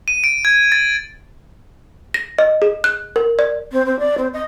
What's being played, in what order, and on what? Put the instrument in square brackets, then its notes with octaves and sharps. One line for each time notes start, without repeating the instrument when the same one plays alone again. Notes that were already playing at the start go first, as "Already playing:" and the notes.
[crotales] D#7
D7
G#6
A6
[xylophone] A#6
D#5
G#4
F#6
A#4
D5
[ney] C4
C4
D5
C4
D#5